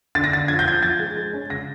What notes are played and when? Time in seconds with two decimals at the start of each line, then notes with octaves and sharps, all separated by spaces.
0.15 D3 A6
0.24 A#6
0.32 D3 A6
0.48 F3 G#6
0.59 G6
0.66 F3 G#6
0.83 F3 A6
0.99 G#3
1.16 G#3
1.33 C#4
1.50 C#3 A#6